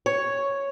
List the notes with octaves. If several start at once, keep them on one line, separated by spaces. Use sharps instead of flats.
C#5